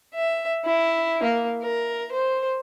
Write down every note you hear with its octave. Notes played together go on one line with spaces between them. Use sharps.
E5
E4
A#3
A#4
C5